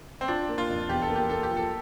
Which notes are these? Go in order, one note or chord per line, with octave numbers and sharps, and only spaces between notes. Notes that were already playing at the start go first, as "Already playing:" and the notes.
C4
D4 F4
A#3
F4
F2
E2 G4
A4
A#3
G4
A#3 A4
G4
F3
A4